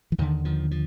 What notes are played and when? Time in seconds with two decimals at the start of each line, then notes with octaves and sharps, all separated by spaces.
0.12 E3
0.18 D#2 D3 D#3
0.45 D#3 F3
0.71 F3